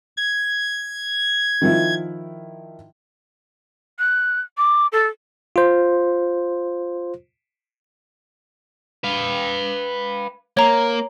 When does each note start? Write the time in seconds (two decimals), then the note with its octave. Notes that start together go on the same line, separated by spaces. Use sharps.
0.17 G#6
1.62 D#3 F3 E4
3.99 F#6
4.58 D6
4.92 A4
5.56 F4 C5
9.04 B4 F5
10.57 A#3 C#5 A#5